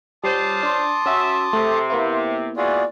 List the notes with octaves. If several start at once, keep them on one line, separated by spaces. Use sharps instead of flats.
G3 C#4 F4 C5 A5 D6 D#6
D4 C6
C#4 F#4 E5
C3 A3
A#3 B3 E4
E3 G#3 F4 F#4 G#4 D5